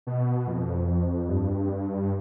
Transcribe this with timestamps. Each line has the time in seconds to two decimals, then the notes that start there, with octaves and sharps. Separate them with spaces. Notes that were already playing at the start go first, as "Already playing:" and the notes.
0.07 B2
0.47 F2
1.29 G2